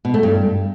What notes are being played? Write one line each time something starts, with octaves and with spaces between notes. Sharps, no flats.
B2
A3
G2